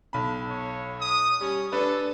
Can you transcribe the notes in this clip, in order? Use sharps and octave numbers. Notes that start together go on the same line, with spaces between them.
B1 B5
C#5
D#6
G3 C#4
D4 A4 B4